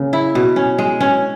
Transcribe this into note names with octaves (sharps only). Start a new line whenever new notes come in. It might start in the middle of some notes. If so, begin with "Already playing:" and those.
Already playing: C#3 A#3
E4
B2
C#4
G#3
C#4